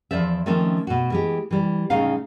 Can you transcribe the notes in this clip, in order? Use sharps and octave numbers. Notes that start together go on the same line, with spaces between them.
E2 F3 C5 D5 E5
D#3 F3 A3 C4 C#4
B2 F#4
E3 G#3 G4
E3 G3
D2 A2 C#3 G#3 D#4 F5